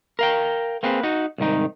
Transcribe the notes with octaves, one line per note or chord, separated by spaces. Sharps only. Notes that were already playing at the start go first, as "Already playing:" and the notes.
A#4 F5 G5
A#3 C4 G#4 B4
D#4 F#4
C2 G#2 D#3 D#4